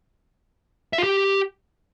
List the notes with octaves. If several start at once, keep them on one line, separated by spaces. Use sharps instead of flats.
E5
F4
G4